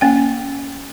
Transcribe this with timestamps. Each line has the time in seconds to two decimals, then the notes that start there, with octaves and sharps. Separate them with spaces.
0.01 A#3 C#4 G5